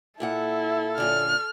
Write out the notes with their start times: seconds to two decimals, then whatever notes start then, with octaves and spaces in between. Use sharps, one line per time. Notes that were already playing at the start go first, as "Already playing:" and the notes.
0.20 A#2 A#3 E4 A4 F#5
0.98 F#2 A#2 D3 F6